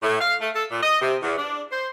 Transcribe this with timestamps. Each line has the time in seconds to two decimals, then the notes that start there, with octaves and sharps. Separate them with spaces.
0.02 A2
0.20 F5
0.40 A3
0.55 A4
0.70 A#2
0.82 D#5
1.01 C3
1.21 E2
1.37 D4
1.70 C5